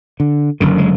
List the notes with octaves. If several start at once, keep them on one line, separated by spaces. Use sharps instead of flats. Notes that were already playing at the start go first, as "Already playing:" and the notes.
D3
F#1 F#2 D3 D#3
G#3